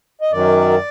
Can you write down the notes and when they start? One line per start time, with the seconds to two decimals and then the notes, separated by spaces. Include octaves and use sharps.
0.21 D#5
0.32 F#2 D#3 F#3 D5